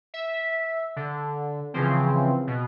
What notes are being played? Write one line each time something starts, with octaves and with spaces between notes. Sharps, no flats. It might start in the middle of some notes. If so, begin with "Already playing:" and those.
E5
D3
C#3 E3 F3 C4
B2